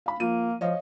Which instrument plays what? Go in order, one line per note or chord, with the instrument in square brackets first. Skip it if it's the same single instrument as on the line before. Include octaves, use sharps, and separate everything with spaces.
[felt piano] F5 B5
[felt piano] F3 D#7 [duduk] A#3
[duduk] F3 [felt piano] C#5 D#5 F5